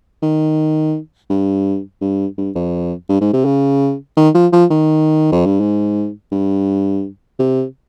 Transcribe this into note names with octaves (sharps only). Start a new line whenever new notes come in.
D#3
G2
G2
G2
F2
G2
G#2
C3
C#3
D#3
F3
F3
D#3
F2
G2
G#2
G2
C3